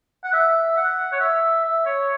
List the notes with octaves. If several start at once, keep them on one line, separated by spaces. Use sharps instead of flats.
F#5
E5
F#5
C#5
E5
E5
C#5